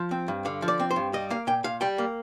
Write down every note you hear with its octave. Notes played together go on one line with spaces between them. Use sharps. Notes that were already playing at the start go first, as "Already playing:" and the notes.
Already playing: F3 C5
C4
G2
D3 F5
F3
D5
C4
C5
G2
G3 D#5
A#3 F5
A#2 G5
A#2 F5
G3 G5
A#3